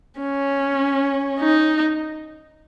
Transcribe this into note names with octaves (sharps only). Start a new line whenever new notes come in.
C#4
D#4